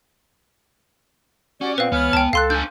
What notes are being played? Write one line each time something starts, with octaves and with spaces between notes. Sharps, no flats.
C#4 F#4 G4 D5
A#2 B3 C4 B4 F5
C#2 E3 B3 C#5 F6
C#2 G5 A5
C#2 A4 F5 C6 F#6
D4 G#5 G6